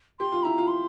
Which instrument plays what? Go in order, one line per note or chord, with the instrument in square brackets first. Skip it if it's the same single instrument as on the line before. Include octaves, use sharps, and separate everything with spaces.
[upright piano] G4 [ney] C6
[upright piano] F4
[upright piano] E4 [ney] A#5
[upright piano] F4
[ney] C6